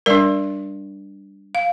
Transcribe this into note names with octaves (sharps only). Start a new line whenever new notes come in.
G3 D4 A#4 D5
F5